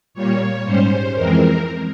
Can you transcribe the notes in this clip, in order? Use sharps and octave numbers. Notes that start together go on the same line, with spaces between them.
A#2 G3 A#3 C#5
G#2 G3 C#4 C5
F2 E3 G#3 C4 A#4